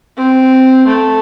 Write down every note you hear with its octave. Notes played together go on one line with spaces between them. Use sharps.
C4
A3